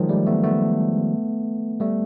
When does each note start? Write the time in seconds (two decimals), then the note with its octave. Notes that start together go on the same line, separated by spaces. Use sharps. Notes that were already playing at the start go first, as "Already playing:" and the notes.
Already playing: D#3 F3 F#3 G#3
0.09 G3 A3
0.26 A3 B3
0.43 A3 B3
1.80 G3 A3